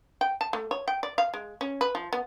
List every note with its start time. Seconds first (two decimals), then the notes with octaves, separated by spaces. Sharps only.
0.21 G5
0.41 A5
0.53 A3
0.71 C#5
0.88 G5
1.03 D5
1.18 F5
1.34 G#3
1.61 C#4
1.81 B4
1.95 F3
2.13 B3